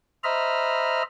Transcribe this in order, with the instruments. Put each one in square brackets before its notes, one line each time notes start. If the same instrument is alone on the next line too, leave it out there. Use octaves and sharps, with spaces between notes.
[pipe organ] C5 D#5 E5 A#5 B5 F6